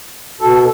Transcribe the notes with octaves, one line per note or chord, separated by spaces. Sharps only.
B2 A4